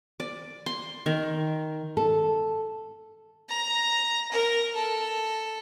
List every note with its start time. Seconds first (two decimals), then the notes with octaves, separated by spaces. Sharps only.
0.20 D5
0.66 C6
1.06 D#3
1.97 A4
3.49 A#5
4.31 A#4
4.75 A4